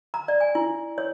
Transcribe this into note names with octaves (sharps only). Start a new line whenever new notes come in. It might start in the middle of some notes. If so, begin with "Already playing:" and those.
A#5
D5
G#5
E4
C#5